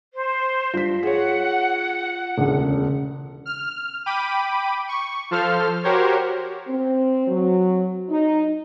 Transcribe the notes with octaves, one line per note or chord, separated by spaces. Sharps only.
C5
G2 F4 B6
G#4 C#5 F#5
E1 D2 C#3
F6
G5 B5 D6 D#7
C#6
F3 A4 C5 F5 F6
F#4 G4 A#4 C5 C#5
C4
F#3
D#4